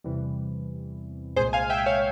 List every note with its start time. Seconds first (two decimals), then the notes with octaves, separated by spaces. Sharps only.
0.04 E2 C3 E3 G3
1.36 C2 A#2 G#3 G#4 C5
1.53 F5 G#5
1.70 E5 G5
1.86 C#5 F5